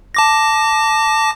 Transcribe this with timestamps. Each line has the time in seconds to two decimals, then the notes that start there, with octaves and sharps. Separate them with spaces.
0.15 A5 D6 A#6